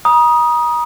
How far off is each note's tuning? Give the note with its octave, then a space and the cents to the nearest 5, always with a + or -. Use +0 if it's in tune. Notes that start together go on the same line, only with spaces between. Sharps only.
A#5 +40 D#6 +0